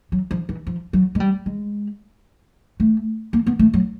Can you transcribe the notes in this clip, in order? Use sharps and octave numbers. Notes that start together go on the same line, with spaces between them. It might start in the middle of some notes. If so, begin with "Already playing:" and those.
F#3
F3
E3
F3
F#3
G#3
G3
G#3
A3
A#3
B3
A3
F#3